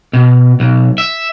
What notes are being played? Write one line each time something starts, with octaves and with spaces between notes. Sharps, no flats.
B2
B1
E5